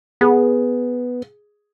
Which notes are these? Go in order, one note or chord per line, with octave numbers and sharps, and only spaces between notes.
B3 G#4